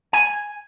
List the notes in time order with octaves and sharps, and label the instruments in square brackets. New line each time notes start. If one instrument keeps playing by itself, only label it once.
[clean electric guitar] G#5